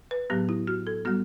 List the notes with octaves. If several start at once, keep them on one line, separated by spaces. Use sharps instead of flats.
B4
A2 F#3 B3 G4
E4
F#4
A4
G3 B3 F#4